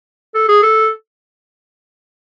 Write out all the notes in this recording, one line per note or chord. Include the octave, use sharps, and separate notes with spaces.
A4
G#4
A4